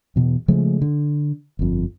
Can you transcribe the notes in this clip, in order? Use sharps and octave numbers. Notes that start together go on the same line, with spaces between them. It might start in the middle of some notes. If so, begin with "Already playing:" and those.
E2 B2 E3
C#3 F3 G#3 A3
D3
G1 F2